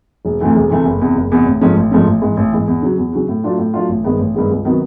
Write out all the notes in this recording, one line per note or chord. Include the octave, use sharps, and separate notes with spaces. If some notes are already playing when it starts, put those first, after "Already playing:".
E1
D2 C3 E3 A3
E1
D2 C3 E3 A3
F#1
E2 C3
F#1
E2 C3
A1
G#2 F3 A3 C#4
A1
G#2 F3 A3 C#4
A1
G#2 E3
A1
G#2 E3
E2
C#3 F#3
E2
C#3 F#3
A2
F#3 A3 D4 F4
A2
F#3 A3 D4 F4
A1
G2 D#3 G#3 B3
A1
G2 D#3 G#3 B3
C#2
C3 D#3 F#3 B3